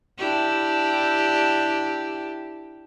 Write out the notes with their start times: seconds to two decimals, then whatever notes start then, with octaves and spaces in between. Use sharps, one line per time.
0.18 D4 E4 G4